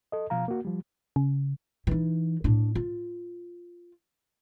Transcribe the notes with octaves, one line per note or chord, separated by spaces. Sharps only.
A4 D#5
B2 F3 F5 A#5
A#3 F#4
F3 G3
C#3
E3 D#4
A2 D4
F4